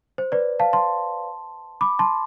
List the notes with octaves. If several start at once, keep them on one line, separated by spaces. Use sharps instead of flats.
C5
B4 D5
F5 A5
A5 C6
B5 D6
A5 C6